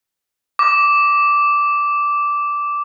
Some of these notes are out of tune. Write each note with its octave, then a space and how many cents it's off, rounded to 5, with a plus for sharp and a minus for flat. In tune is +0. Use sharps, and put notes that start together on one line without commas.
D6 -10